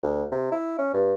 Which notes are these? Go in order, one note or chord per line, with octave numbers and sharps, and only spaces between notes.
D2
C3
E4
C#4
G2